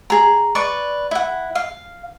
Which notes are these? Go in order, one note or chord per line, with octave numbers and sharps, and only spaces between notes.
G#4 A#5
B4 D5 C#6
E4 F#5
F5